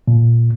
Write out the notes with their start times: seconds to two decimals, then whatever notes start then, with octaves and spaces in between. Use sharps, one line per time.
0.08 A#2